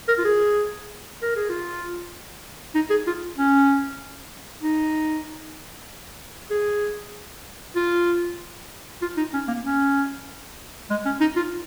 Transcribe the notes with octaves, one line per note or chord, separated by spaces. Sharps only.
A#4
F4
G#4
A#4
G#4
F4
D#4
G#4
F4
C#4
D#4
G#4
F4
F4
D#4
C#4
A#3
C#4
G#3
C#4
D#4
F4